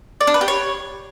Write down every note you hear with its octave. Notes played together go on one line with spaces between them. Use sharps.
D5
D4
B4
G4
C#5